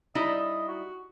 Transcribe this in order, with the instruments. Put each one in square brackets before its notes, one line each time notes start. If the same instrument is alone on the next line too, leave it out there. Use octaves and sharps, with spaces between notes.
[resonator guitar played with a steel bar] G3 D#4 E4 [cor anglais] D#5
[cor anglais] F#4